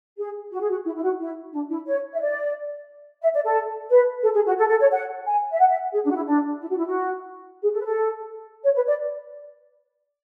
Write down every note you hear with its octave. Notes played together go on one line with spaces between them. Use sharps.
G#4
F#4
G#4
F#4
E4
E4
F#4
E4
D4
E4
C#5
E5
D5
E5
D5
A4
B4
A4
G#4
F#4
A4
A4
C#5
F#5
G#5
E5
F#5
E5
G#4
D4
F#4
E4
D4
E4
F#4
E4
F#4
G#4
A4
B4
A4
C#5
B4
D5